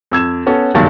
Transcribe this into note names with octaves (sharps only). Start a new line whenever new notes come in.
F2 E6 G#6 E7
B3 C#4 A4 C#5
F#1 B1 G2 D#3 A5 A6